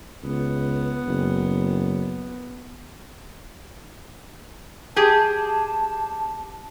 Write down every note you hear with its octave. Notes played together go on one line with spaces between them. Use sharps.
C#2 B3
F#1
G4 G#4 A5